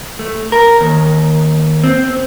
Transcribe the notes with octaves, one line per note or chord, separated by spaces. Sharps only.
A3
A#4
D#2
C4